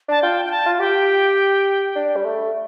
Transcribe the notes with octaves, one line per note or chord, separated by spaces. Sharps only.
D4 A5
F4 G5
G5
A5
F4
G4 G5
D4
G3
A3